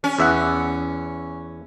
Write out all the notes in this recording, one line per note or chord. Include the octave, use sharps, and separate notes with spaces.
C#4
E2 E5 F#5